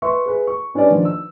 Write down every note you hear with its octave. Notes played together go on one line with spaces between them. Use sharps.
B4 E5 C6 C#6
G#4 B4
C#6
G3 C#4 D4 B4 D5
D#3 F3 D4
E6